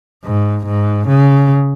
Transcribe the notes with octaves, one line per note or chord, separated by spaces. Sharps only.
G#2
G#2
C#3